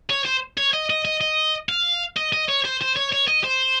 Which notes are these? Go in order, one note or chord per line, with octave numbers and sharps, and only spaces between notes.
C#5
C5
C#5
D#5
D#5
D#5
D#5
F5
D#5
D#5
C#5
C5
C5
C#5
C#5
D#5
C5